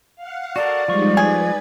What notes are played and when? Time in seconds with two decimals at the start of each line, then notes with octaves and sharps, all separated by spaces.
0.16 F5 F#5
0.56 F#4 A4 A#4 D5
0.88 F3 G3 G#3 D#4 C#6
1.17 G#4 B4 G#6